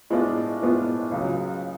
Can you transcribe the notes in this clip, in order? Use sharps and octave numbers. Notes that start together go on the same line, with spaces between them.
A2 G#3 B3 D4 F4
A2 G#3 B3 D4 F4
C#2 C#3 F#3